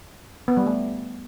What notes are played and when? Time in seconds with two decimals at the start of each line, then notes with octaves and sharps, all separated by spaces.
0.48 B3
0.57 G3
0.66 A3